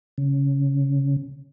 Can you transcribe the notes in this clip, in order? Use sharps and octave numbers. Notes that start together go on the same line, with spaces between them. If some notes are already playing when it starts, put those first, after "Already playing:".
C#3